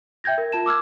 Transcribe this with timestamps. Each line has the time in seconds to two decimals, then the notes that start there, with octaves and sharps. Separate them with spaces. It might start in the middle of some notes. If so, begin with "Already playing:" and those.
0.24 E5 G5 G6 G#6 A#6
0.38 A#4
0.52 F4 A5 E7
0.66 D6 E6 F6 G#6